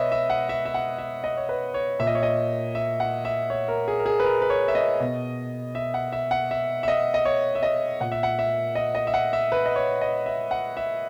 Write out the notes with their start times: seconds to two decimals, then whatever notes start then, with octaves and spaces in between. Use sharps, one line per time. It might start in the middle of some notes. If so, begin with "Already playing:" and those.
Already playing: B2 B4 C#5 D#5 E5
0.12 E5
0.30 F#5
0.49 E5
0.65 E5
0.74 F#5
0.98 E5
1.24 D#5
1.37 C#5
1.49 B4
1.74 C#5
1.99 A#2 E5
2.07 D#5
2.15 C#5
2.23 D#5
2.75 E5
3.00 F#5
3.25 E5
3.50 C#5
3.68 A#4
3.88 G#4
3.99 A#4
4.06 G#4
4.20 B4
4.25 A#4
4.42 B4
4.50 C#5
4.68 E5
4.75 D#5
5.00 B2
5.75 E5
5.94 F#5
6.12 E5
6.31 F#5
6.51 E5
6.83 E5
6.88 D#5
7.14 D#5
7.25 C#5
7.55 E5
7.63 D#5
8.00 A#2 F#5
8.12 E5
8.23 F#5
8.39 E5
8.75 D#5
8.95 D#5
9.07 E5
9.14 F#5
9.33 E5
9.52 B4
9.66 D#5
9.76 C#5
10.01 D#5
10.26 E5
10.51 F#5
10.77 E5